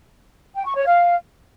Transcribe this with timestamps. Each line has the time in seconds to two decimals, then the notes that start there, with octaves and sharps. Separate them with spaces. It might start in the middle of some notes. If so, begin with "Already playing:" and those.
0.56 G5
0.66 C#6
0.76 C#5
0.86 F5